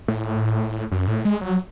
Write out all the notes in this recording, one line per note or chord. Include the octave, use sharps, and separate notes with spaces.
A2
F#2
A2
G#3
F#3